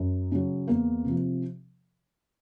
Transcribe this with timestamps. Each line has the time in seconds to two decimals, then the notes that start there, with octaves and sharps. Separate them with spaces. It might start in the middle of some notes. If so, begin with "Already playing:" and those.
Already playing: F#2
0.32 C#3 F#3
0.68 E2 A#3
1.04 C3 F3